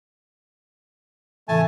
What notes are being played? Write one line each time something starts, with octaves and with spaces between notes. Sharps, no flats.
A2 C3 E3 A3 G#5 A5